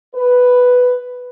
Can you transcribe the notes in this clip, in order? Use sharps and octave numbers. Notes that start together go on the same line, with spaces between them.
B4